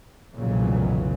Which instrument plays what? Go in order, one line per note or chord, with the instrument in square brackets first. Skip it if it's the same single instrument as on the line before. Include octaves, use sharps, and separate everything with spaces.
[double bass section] F1 B1 A#2 C#3 E3 F#3